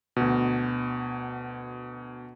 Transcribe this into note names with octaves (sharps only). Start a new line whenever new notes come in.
D2 B2